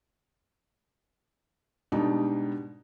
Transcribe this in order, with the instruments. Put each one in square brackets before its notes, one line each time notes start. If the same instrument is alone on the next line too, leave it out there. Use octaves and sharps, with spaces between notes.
[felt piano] G#2 B2 G3 D4 D#4